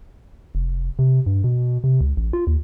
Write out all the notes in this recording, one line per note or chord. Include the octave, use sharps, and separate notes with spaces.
F1
C3
G2
B2
C3
C#2
A1
F4
D#2